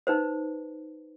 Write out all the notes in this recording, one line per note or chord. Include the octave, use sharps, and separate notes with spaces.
D#4 B4 C5